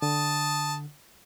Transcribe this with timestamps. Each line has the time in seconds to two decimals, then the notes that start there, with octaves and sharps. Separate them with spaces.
0.02 D3 A5 D#6